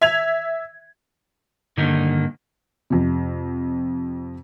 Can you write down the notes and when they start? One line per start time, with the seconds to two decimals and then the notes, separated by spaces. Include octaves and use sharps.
0.01 E5 G#6 F7
1.77 G2 D3 D#3 A#3 D#4
2.90 F2 C3